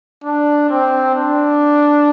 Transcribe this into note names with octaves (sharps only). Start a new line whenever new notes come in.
D4
C4
D4